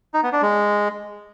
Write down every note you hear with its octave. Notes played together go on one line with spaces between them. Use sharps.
D#4
B3
D4
G#3